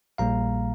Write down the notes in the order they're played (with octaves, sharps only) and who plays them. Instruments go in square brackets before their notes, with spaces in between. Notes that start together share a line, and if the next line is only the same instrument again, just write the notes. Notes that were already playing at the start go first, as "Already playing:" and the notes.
[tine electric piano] A#1 A#2 G3 A#3 F5 A#5